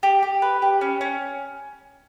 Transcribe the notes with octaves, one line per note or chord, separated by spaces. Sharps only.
G4
G4
B4
G4
C#4
C#4